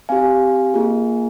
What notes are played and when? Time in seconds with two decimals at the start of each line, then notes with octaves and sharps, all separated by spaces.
0.09 C4 G4 F5 G#5
0.74 A#3 F4 G#4